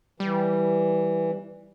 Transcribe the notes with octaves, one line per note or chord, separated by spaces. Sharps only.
E3 G3